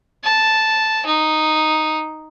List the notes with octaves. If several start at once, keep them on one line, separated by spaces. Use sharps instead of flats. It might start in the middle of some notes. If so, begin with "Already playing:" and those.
A5
D#4